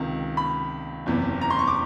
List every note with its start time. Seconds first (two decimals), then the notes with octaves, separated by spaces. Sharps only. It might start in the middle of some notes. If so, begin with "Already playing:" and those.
Already playing: C#2 C3 D#3
0.37 B5
1.06 F#1 E2 C3
1.41 A#5
1.50 C6
1.59 C#6
1.67 D6